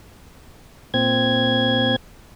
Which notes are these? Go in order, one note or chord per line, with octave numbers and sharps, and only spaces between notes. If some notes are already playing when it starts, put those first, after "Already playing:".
A#2 C4 G#6